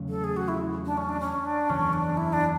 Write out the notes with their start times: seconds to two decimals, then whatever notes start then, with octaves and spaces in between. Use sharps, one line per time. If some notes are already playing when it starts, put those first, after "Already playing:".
Already playing: E2 C#3 F#3 A3
0.09 A4
0.24 G#4
0.36 F#4
0.48 E4
0.85 D4
0.97 C#4
1.09 D4
1.20 C#4
1.45 D4
1.69 F#1 E2 C#3 E3 C#4
1.93 D4
2.17 E4
2.33 D4